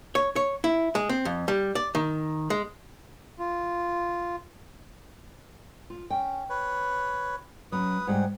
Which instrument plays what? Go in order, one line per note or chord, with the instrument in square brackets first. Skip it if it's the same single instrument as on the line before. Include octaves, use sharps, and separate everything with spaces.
[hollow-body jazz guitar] C#5
C#5
E4
G#3
C4
F2
G3
D5
D#3
G#3
[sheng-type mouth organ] F4
[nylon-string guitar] F4
[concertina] C#4 [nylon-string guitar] G5
[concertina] B4 C#5
[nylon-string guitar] F#3 C#4 [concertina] B4 D#6
[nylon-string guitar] G#2 G3 G4 [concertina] G#4 F#5